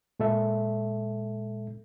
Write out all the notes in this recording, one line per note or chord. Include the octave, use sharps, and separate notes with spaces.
A#2 G#3 A4 E5